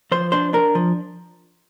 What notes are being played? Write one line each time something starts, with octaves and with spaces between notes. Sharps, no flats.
F3 C5
D4 C5
D4 A#4
F3